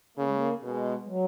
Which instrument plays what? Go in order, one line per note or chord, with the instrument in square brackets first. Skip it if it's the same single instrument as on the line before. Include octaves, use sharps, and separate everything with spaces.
[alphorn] C#3 [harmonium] A#3
[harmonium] G#3
A#3
[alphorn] B2 [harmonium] G#3
[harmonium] G#3
F#3